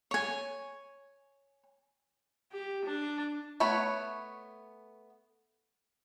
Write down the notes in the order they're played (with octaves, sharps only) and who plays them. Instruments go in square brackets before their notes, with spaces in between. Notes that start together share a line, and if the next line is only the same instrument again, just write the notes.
[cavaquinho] C#5 G#5
[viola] G4
D4
[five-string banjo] A3 B3 C#5 B5